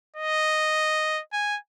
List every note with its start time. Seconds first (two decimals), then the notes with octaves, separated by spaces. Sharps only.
0.16 D#5
1.33 G#5